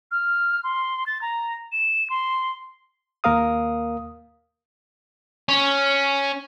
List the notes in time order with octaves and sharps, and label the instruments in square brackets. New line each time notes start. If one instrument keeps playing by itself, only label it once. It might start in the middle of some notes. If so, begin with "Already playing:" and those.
[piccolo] F6
C6
A6
A#5
E7
C6
[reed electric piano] D#2 A#3 A#4 F5 D#6
[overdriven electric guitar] C#4